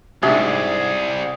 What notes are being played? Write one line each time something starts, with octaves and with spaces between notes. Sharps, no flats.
C2 G#2 C3 D4 F#4 G#4